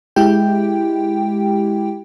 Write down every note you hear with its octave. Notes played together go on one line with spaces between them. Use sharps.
G#3 E4 G4 G5